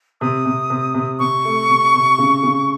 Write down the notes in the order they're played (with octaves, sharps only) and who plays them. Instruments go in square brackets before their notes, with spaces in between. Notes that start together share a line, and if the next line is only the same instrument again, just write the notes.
[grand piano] C3 [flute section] D#6
[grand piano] C3
C3
C3
[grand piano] C3 [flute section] C#6
[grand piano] A3
C3
C3
C#3
C#3